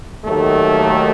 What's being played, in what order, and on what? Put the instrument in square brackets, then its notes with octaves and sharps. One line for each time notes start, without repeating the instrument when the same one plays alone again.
[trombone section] D#2 D#3 F#3 A3